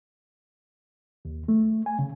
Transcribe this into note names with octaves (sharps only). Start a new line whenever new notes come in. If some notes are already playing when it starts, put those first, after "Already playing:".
D#2
A3
G#5
C#3